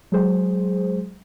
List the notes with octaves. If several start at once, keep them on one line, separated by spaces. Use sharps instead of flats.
F#3 G#3 G#4 C5